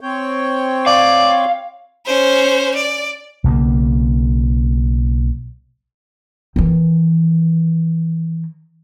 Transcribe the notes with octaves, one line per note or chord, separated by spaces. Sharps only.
C4 C#5 G5
D5 F5
C#4 C5
D5
B1 C#3 G3 A#3
D#3 E3